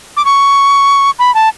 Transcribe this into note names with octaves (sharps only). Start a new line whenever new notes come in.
D6
C#6
B5
A5